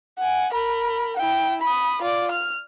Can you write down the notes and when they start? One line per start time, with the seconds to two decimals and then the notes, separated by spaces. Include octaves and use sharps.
0.18 F#5 G#5
0.53 A#4 B5
1.17 E4 G5
1.62 B5 D#6
2.02 F4 D5
2.32 F6